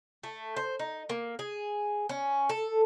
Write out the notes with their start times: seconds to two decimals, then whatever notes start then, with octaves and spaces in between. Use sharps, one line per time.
0.23 A3
0.57 C5
0.79 D#4
1.09 A#3
1.39 G#4
2.09 C#4
2.49 A4